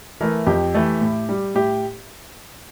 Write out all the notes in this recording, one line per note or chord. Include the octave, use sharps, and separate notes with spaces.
E3 A3 A#4
F2 G4
E3 A3
A2
G3
A2 G4